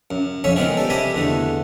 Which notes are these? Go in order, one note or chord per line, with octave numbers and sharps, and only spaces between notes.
F#2
F2 C#4 C#5 E5
D#3 G#3 B3 C4 F4 G#4
G3 A4
C3 G4 D#5 E5 G#5 B5
E2 D3 A3